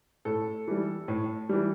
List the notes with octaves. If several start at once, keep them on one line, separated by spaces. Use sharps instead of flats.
A2 A4
E3 G3
A2
E3 G3